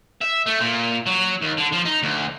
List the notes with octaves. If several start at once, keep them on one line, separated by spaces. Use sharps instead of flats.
E5
A3
A#2
F#3
D#2
D3
F3
D#4
D2